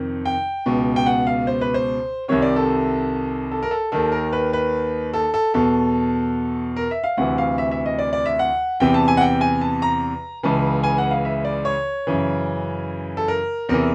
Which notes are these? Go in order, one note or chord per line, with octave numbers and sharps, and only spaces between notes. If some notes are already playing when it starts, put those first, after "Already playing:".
Already playing: F2 C3 D#3
G5
C#2 B2
G5
F#5
F5
C5
B4
C5
C2 C3 D#3 C#5
D5
A4
A4
A#4
A4
D#2 D#3 A4
A#4
B4
B4
A4
A4
E2 B2 A4
A#4
E5
F5
D2 C3 E3 F#5
F5
E5
E5
D#5
D5
D5
E5
F#5
E2 C3 E3 G5
A5
G#5
F#5
G5
G#5
A5
A#5
C#2 C#3 E3 A5
G#5
F#5
F5
E5
D5
C#5
F#2 C#3 E3
A4
A#4
E2 C3 E3 A#4